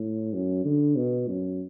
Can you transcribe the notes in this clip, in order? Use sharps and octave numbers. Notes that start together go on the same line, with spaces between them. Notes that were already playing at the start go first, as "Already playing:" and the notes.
Already playing: A2
F#2
D3
B2
F#2